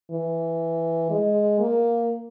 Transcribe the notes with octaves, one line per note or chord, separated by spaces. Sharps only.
E3
G#3
A#3